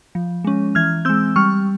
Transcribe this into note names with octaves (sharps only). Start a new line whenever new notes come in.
F3
G#3 C#4
E3 F6 G#6
G#3 C4 E6 G6
G3 C#6 F6